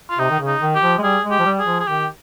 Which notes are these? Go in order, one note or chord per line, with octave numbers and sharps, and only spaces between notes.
F4
C3 D#4
D#3
C#3
D#4
D#3
G4
F3
G#3
G3 G#4
G#3
G4
F3
G3
G#4
F3
G#4
D#3 G4